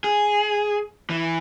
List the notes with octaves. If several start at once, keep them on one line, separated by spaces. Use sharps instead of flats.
G#4
E3